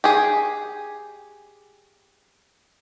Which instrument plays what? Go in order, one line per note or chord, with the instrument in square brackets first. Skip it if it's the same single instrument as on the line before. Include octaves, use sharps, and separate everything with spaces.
[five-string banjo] G4 G#4